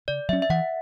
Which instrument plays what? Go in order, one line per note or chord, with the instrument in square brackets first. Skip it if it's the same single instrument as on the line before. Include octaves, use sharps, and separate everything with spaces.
[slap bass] C#3 [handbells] D5
[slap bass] F#3 C#4 [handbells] E5
[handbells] E5
[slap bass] E3 [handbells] F#5